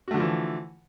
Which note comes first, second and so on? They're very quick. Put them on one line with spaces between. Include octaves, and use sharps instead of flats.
F#4 A3 D3 F3 E3